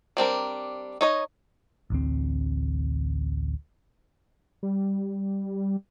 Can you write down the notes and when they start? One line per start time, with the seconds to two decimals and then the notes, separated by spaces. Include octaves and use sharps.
0.17 G3 C4 D4 A#4
1.01 D#4 C#5 D#5
1.90 A1 D2 C4
4.63 G3